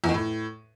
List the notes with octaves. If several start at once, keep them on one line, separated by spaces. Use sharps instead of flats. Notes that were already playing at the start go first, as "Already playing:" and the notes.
E2
D#3
A2